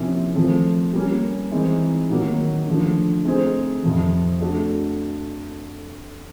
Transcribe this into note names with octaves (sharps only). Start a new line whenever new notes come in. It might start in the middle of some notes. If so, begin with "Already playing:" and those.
Already playing: C3 F3 A#3 C#4 E4
F3 A3 C4
G3 A#3 C#4
E3 G#3 C4 D#4
D#3 F#3 A#3
D3 F3 A3
A3 C4 D#4 G#4 C5
F2 C3 F3
A3 D4 F#4